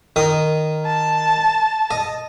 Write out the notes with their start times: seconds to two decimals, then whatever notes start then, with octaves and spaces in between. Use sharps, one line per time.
0.16 D#3 D#6
0.86 A5
1.91 D#5